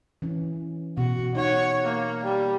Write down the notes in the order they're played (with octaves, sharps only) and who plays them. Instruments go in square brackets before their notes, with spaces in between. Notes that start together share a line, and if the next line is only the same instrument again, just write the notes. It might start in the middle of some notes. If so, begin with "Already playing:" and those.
[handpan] E3 C#4
[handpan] B2 [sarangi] F#4
[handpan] D#4 F#5 [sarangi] C#5
[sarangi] A#3
G3